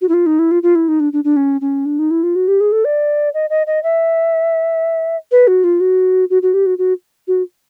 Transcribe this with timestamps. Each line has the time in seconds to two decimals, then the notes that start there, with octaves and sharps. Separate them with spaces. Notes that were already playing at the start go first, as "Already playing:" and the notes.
0.01 F#4
0.09 E4
0.14 F4
0.26 D#4
0.39 E4
0.51 F4
0.63 F4
0.75 E4
0.88 D#4
1.00 D4
1.13 D4
1.24 D4
1.36 C#4
1.61 C#4
1.86 D4
1.99 D#4
2.11 E4
2.23 F4
2.36 F#4
2.48 G4
2.60 G#4
2.72 A4
2.85 D5
3.34 D#5
3.50 D#5
3.67 D#5
3.83 E5
5.32 B4
5.47 F#4
5.64 F4
5.80 F#4
6.30 F#4
6.42 F#4
6.54 G4
6.66 F#4
6.78 F#4
7.28 F#4